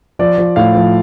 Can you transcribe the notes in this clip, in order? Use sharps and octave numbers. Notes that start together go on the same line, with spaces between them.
F3 D5
F3
A2 F5
F3